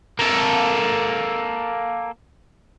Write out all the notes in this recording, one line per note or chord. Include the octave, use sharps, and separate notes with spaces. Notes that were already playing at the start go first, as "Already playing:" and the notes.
A#3 A4